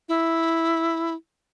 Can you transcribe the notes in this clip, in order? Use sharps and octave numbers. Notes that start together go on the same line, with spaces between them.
E4